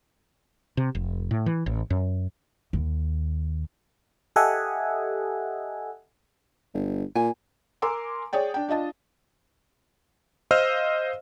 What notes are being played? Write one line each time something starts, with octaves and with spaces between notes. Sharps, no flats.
C3
F1
A2
E3
A1
F#2
D#2
G4 A4 D#5 E5 F#5 G#5
G1
A#2 G#5
A#4 G#5 A#5 C6 D6 E6
G#4 C#5 D5 G5
D4 G5
D4 F4 D#5 A5
C5 D#5 F5 E6 F6